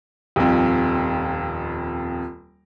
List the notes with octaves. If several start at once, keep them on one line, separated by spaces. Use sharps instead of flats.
D#1 F2